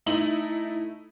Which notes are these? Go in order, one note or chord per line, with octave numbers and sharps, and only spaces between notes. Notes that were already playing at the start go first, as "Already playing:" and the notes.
A3 D#4 E4 F#7